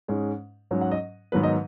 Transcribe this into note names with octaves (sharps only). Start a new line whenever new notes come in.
G#2 G#3 C#4
G#2 F#3 C#4
F#5
D#5
G#2 D#3 F#3 B3 B4
D#5